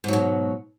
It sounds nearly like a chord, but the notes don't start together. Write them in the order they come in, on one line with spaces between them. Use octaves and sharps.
G#2 F#3 B2